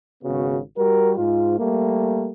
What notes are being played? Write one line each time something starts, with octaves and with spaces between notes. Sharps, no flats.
G#1 C#3 B3 F#4
G3 F#4 A#4
G#2 F4
G3 A3 A#3